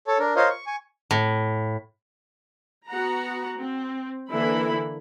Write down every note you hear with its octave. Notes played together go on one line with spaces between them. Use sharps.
A4 C#5 A5
D4 A#4
F4 A#4 C5 C#5 D#5 F5
C#6
G#5 C#6
A2
B3 F#4 F#5 A#5
C4
D3 E3 A#3 E4 B5